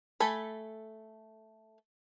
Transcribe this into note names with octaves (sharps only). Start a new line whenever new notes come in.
A3 A4 G#5 B5